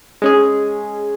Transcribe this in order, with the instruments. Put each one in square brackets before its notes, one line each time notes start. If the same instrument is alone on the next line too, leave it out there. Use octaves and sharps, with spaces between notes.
[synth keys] G#3 C#4 G#4